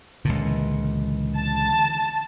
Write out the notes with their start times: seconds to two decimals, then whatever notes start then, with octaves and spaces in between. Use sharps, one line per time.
0.25 C#2 A#2 D3 E3
1.38 A5